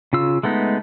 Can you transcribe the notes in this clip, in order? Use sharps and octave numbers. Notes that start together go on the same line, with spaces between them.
C#3 F4 E6
G#3 A3 B3 D#4